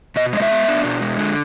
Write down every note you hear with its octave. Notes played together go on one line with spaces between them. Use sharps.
B2 D#5
G#3 D#5
E5
B3
D4
B2
G#3
D3